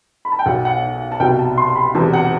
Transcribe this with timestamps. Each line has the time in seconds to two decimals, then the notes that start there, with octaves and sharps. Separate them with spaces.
0.25 B5
0.32 A5
0.39 G5
0.46 B1 B2 F#3 F#5
0.65 F#5
1.12 A5
1.20 C2 B2 F#3 G5
1.39 A5
1.58 C6
1.75 B5
1.95 E1 E2 C3 F#3 A5
2.13 F#5